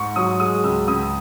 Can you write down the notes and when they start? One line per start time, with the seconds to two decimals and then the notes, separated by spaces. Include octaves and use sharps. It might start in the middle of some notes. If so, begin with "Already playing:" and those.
Already playing: G#2 C#6
0.16 F#3 D#6
0.40 G#3 D#6
0.64 C#2 E6
0.87 C#2 D#6